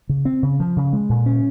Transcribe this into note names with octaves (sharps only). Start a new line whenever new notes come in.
C#3
C4
C#3
F3
C#3
G#3
A#2
C#4